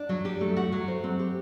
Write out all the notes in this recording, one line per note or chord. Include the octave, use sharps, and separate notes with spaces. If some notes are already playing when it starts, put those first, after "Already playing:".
Already playing: D4
F#3
G4
A3
F#4
F#3
C5
C4
G4